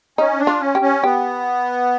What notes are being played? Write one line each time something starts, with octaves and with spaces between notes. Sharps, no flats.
C#4 D#4
D4
F4
C#4
G4
C#4
B3 G4